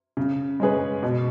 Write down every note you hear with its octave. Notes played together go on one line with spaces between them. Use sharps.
C#3
G#3 C#4 G#4 B4
B2